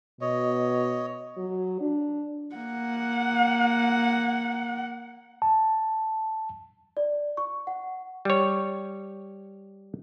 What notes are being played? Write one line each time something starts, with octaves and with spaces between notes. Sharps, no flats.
B2 C#5 D#5
F#3
D4
A#3 F#5
A5
D5
C#6
F#5
G3 C#5